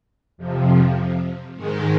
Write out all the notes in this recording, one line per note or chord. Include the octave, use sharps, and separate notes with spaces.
F2 C3 F3
G#2 D#3 G#3